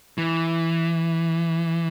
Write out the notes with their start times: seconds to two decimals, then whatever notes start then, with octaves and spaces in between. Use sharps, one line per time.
0.18 E3